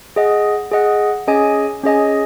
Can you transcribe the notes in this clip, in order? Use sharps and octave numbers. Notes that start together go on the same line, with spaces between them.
G#4 D#5 F#5
G#4 D#5 F#5
C#4 G#4 D#5 G#5
C#4 G#4 D#5 G#5